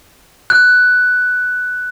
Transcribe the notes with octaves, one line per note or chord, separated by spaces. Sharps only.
F#6